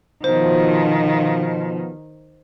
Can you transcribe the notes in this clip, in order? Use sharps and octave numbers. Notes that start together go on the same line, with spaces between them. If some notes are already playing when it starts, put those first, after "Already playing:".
B2 D#3 F3 C5